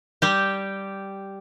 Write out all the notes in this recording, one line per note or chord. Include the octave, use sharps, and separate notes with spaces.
G3 G4